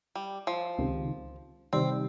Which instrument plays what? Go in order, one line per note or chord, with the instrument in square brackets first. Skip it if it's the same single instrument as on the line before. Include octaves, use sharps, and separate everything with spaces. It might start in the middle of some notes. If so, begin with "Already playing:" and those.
[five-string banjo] G3
F3
[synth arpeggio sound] C#2 C3 D#3
[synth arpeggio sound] C3 D#3 G3 [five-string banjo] C4